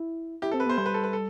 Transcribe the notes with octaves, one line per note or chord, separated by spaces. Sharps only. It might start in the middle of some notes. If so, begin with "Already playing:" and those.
Already playing: E4
E4 G4
C4 A4
B4
B3 C5
G3 C5
B4
A4
B4
A4